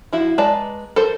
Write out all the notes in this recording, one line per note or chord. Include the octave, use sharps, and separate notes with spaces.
F3 E4 F#4
G#3 B4 D5 A5 A#5
A4 A#4 C5